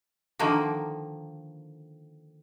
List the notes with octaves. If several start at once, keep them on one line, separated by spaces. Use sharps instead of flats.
D3 D#3 F3 A#3